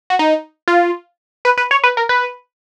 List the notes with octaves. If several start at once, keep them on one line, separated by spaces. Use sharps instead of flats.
F#4
D#4
F4
B4
B4
C#5
B4
A#4
B4